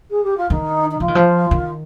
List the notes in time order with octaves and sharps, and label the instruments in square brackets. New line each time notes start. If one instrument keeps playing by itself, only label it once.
[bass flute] G#4
G4
F4
[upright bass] D#3 [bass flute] D#4
[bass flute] D#4
[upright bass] F3 [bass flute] F4
[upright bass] D#3
F3
D#3